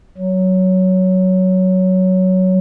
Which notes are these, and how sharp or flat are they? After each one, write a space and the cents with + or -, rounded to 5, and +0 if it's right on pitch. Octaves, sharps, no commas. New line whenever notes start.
F#3 +10